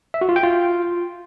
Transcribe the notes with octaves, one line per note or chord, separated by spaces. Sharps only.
E5
F#4
F4
G5
F4